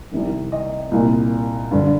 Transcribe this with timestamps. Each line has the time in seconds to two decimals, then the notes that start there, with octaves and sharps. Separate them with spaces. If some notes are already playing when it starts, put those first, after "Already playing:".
0.11 C2 C3 D#3
0.52 D#5
0.91 C2 A#2
1.71 G2 D3